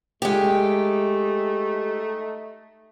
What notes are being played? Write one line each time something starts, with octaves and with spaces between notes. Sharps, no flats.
G#3 A3 D#4 G4